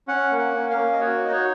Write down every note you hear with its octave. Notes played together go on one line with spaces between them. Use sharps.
C#4 F#5
A#3
F#5
C#4
F5
A#3
D#5
F#4 C#5
D#4 D#5
C#5